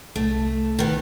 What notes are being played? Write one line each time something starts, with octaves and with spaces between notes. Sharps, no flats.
C2 A3
D#3 B3